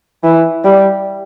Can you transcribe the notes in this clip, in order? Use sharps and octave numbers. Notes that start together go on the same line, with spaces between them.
E3
G3